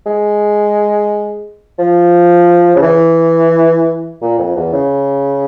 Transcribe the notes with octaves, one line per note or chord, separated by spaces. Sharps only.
G#3
F3
C#3
E3
A#2
F2
E2
C#3